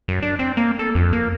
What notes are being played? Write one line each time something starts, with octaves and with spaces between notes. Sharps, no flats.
F#2
D4
C4
A#3
A4
F2
A#3